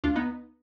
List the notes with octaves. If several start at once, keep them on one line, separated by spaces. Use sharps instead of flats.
D2 D4 F4
B3 D#4